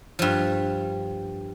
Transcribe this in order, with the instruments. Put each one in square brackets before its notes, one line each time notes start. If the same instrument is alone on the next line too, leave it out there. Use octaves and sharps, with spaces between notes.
[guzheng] G2 F3